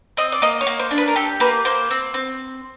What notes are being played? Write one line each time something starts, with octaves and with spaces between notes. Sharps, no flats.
C4 D#5
D5
A#3 D#5
C#5
A#3
C5
D4
B4
A#4
G4 A4
A#3 B4
A#3 C5
C4
C4